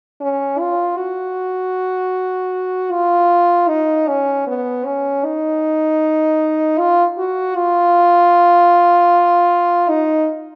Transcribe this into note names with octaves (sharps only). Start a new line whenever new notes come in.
C#4
F4
F#4
F4
D#4
C#4
B3
C#4
D#4
F4
F#4
F4
D#4